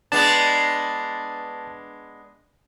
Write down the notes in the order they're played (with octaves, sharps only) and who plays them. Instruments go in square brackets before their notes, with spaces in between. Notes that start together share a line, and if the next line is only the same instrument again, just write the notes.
[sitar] G#3 B3 D4 [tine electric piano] A5